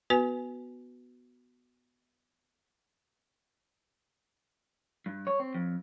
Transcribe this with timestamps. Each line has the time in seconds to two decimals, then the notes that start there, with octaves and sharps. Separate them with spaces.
0.10 B3 F#4 B4 G#5
5.06 G2
5.27 C#5
5.40 C4
5.54 F2